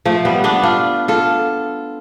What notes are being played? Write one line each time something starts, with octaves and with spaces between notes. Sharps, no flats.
F3 A3
G3 B3
B3 D4
D4 F4
F4 A4